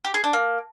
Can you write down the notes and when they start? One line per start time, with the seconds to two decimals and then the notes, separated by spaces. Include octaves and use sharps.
0.05 G4
0.14 G#4
0.24 D4
0.33 A#3